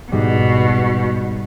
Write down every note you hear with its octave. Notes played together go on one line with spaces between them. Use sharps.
G#2 B2 G3